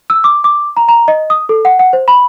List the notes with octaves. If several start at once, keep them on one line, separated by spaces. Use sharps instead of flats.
E6
D6
D6
A#5
A#5
D#5
D#6
A4
F#5
F#5
C5
B5